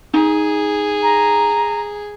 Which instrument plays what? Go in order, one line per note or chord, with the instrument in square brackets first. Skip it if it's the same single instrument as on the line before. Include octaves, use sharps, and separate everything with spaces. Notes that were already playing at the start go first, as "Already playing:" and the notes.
[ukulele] D#4 [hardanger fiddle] G#4
[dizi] A#5